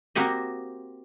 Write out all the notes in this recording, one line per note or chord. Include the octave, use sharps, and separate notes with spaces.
A#3 C4 F#4 G4 D#5